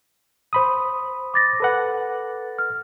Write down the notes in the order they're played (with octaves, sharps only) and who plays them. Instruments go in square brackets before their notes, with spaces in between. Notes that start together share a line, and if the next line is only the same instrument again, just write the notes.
[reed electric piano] C5 B5 D#6
[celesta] D6 A6 A#6
[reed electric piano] A4 B4 F#5
[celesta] F6